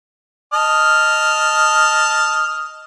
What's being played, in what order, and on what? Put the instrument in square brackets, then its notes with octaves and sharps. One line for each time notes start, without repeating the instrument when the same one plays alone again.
[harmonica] D#5 A5 F6